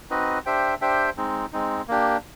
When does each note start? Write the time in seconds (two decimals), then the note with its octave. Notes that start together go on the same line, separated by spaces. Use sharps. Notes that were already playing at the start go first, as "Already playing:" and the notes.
0.10 C4 D#4 F#4 B4 D#5
0.46 D4 G4 C5 E5 G5
0.81 D4 G4 C5 E5 G5
1.17 G#3 C4 D#4
1.53 G#3 C4 D#4
1.88 A#3 D4 G4